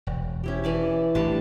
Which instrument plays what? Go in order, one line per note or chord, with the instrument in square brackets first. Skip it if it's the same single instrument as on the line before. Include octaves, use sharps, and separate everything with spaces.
[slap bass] E1
[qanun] C#4 E4 G4
E3 D5 A5
[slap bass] A1 [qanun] G3 D4 A5